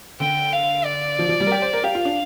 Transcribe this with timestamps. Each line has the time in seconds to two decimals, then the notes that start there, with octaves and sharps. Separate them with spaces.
0.20 D3 G5
0.53 F5
0.85 D5
1.19 F3
1.29 F3
1.40 G3
1.47 A#4
1.52 G4
1.62 C5
1.73 A#4
1.84 G4 F5
1.95 F4
2.05 D4